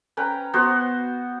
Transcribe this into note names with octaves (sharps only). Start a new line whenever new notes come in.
C#4 B4 G5 A#5
B3 F#4 C5